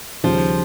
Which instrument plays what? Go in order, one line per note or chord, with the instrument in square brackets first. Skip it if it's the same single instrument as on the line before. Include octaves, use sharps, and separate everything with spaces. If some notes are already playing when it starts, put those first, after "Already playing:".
[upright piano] D#2 C#3 G3 [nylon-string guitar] F3